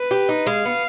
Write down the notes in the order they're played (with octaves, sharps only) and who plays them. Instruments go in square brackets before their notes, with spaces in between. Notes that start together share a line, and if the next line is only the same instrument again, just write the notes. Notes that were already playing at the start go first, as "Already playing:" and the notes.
Already playing: [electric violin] B4
[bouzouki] G4
D#4
[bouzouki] G#3 [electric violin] F5
[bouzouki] B3